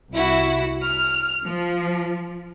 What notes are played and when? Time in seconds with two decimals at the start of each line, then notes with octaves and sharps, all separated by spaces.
0.11 C2 E4 F#4
0.83 F6
1.46 F3